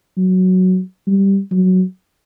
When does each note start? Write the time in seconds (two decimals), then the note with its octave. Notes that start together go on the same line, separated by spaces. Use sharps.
0.17 F#3
1.07 G3
1.51 F#3